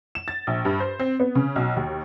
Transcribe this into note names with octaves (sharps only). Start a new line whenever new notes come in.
E7
A6
A#1
G2
C5
C4
B3
C#3
B1
D#2